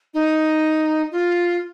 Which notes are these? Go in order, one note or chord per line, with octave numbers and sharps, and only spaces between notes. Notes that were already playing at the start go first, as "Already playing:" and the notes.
D#4
F4